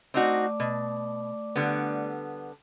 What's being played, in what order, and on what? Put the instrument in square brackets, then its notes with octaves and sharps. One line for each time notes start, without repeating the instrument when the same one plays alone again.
[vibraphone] A3 D5 D6 [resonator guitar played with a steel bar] C4 D#4 F#4
[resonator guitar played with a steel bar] B2
D3 G3 B3